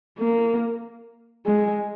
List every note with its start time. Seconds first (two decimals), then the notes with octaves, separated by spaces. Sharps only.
0.18 A#3
1.46 G#3